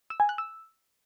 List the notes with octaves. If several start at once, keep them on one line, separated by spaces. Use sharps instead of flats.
E6
G#5
F#6
E6